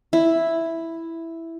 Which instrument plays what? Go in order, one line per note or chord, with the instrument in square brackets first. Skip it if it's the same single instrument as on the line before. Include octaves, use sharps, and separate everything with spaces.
[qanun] E4